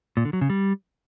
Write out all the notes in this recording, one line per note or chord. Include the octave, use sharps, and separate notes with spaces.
A#2
D3
F#3
C#3
G3